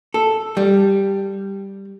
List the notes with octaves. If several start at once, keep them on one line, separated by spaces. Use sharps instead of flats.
A4
G3